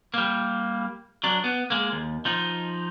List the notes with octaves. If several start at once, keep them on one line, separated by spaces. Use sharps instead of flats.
G3 A#3
F#3 D4
B3
G#3 A#3
D#2
F3 D#4